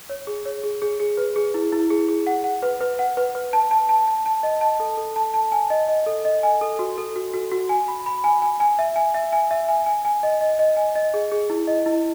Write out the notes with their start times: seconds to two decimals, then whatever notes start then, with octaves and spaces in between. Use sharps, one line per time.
0.09 C#5
0.27 G#4
0.46 C#5
0.63 G#4
0.82 G#4
1.00 G#4
1.17 B4
1.36 G#4
1.54 E4
1.73 E4
1.90 G#4
2.08 G#4
2.27 F#5
2.44 F#5
2.62 B4
2.81 B4
2.99 F#5
3.17 B4
3.35 B4
3.53 A5
3.71 A5
3.89 A5
4.07 A5
4.26 A5
4.43 D#5
4.61 A5
4.80 A4
4.97 A4
5.16 A5
5.34 A5
5.52 G#5
5.70 D#5
5.88 D#5
6.06 A4
6.25 D#5
6.43 G#5
6.61 A4
6.79 F#4
6.98 A4
7.16 F#4
7.34 F#4
7.52 F#4
7.69 G#5
7.88 B5
8.06 B5
8.24 G#5
8.42 G#5
8.60 G#5
8.79 E5
8.96 G#5
9.14 E5
9.33 G#5
9.51 E5
9.68 G#5
9.86 G#5
10.05 G#5
10.23 D#5
10.41 D#5
10.59 D#5
10.77 G#5
10.95 D#5
11.14 G#4
11.32 G#4
11.50 E4
11.67 D#5
11.86 E4